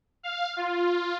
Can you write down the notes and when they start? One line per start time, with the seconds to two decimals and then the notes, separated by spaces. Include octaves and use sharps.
0.23 F5
0.56 F4